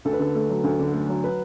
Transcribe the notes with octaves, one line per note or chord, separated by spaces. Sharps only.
D2 A4
B4
D3 A4
A3
F#3
D2
D3
A3
F#3
B4